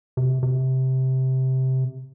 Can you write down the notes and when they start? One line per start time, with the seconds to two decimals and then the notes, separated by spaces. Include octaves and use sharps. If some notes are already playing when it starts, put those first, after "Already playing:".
0.17 C3
0.43 C3